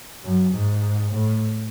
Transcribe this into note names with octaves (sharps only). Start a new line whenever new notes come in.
F#2
G#2
A2